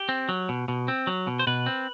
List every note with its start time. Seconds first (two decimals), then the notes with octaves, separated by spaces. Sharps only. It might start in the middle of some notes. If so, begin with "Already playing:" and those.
Already playing: G4
0.09 C4
0.29 F#3
0.49 B2
0.68 B2
0.88 C4
1.07 F#3
1.27 B2
1.39 C5
1.47 B2 B4
1.66 C4